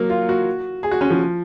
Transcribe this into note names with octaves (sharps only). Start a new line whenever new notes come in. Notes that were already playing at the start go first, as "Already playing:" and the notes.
Already playing: F#3 A#3
F4
F#4
G#4
F#4
C#4
F3